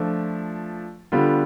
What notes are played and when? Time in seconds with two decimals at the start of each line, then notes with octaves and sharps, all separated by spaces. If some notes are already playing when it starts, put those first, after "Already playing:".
Already playing: F3 A3 D4
1.12 D3 G3 B3 F4